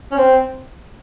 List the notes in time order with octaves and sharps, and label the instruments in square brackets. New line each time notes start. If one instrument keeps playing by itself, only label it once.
[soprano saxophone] C#4
C4